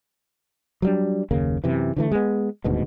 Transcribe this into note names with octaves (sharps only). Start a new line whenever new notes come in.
F#3 G3 D4
F#1 D#2 C#3 A#3
F#2 C3 E3
D3 E3 A3
G#3 B3
D#1 D2 G#2 B2